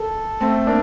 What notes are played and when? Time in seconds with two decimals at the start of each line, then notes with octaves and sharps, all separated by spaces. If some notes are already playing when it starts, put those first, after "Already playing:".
Already playing: A4
0.40 A3 C4
0.67 A#3 D4